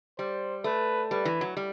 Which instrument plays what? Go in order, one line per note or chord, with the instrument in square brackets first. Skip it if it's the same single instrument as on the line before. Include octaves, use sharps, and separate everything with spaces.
[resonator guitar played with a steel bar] G3 [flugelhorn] C5
[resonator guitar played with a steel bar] A3 [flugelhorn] B4
[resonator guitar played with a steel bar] G3 [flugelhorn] B4
[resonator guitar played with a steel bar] E3
F#3
G3